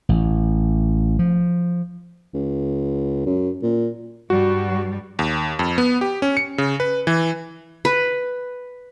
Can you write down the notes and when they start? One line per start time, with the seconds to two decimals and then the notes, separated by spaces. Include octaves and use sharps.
0.09 A1
1.19 F3
2.34 C#2
3.26 F#2
3.63 A#2
4.30 G2 G3 F#4
5.19 D#2
5.59 F2
5.78 B3
6.01 G4
6.22 C#4
6.37 C#7
6.58 C#3
6.80 B4
7.07 E3
7.85 B4